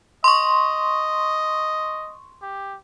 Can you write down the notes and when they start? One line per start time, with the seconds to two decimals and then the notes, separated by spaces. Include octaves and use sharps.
0.24 D#5 C6 C#6
2.42 G4